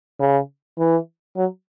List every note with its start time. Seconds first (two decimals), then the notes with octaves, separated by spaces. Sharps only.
0.20 C#3
0.78 E3
1.36 F#3